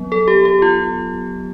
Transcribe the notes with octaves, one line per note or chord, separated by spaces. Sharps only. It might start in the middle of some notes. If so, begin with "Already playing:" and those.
Already playing: F#3 B3
A4
G4
G4
F4